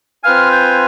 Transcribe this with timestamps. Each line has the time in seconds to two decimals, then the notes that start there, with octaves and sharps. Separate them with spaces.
0.23 C4 F4 B4 F5 G#5 F6
0.52 G6